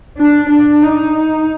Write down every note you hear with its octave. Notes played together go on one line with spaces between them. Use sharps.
D4
D4
D#4